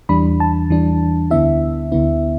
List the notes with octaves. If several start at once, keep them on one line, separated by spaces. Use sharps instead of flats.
E2 E3 G3 D4 B5
A5
E2 E3 G3 D4
D2 D3 B3 E4 E5
D2 D3 B3 E4